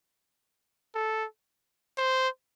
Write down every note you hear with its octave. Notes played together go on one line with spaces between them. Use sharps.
A4
C5